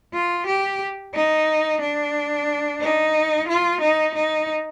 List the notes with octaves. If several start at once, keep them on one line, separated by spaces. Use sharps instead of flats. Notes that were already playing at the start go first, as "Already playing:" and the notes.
F4
G4
D#4
D4
D#4
F4
D#4
D#4